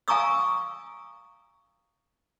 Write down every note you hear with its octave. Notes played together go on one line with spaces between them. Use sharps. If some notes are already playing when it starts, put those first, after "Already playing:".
F5 G#5 A#5 C#6 D#6 E6